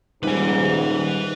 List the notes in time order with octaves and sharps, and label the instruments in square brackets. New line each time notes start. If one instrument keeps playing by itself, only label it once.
[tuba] D#1 [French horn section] G#2 [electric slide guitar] D#3 G3 [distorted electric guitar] B4 G#5